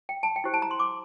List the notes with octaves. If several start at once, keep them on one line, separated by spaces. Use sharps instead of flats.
G5
A5
G5
E4 G4 C5
A5
A#5
C6
D6